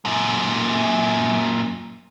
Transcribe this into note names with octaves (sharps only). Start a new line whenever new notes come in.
F#2 A#2